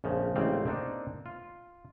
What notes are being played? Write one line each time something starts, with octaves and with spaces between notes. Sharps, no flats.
A#1 F2 C#3 F3
A1 G#2 C#3 C4 D5 F5
A#3 C4 D4 D#4
F4